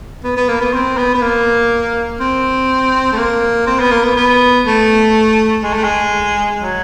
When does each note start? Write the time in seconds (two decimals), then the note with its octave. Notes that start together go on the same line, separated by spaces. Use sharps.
0.24 B3
0.37 B3
0.49 A#3
0.61 B3
0.73 C4
0.97 B3
1.14 B3
1.22 A#3
2.20 C4
3.12 A3
3.18 A#3
3.67 C4
3.79 B3
3.91 A#3
4.04 B3
4.16 B3
4.65 A3
5.63 G#3
5.74 A3
5.84 G#3
6.61 F#3